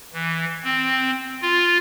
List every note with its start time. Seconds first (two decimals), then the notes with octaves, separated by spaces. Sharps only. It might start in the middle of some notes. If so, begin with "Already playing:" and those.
0.13 E3
0.63 C4
1.42 F4